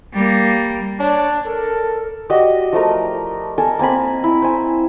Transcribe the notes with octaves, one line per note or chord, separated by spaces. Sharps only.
G3 A#3
D4 C#5
A4 A#4
F#4 G4 D5 D#5
F3 A3 A#4
A4 A#4 G#5
A#3 C4 G#5 B5
E4
C5 G#5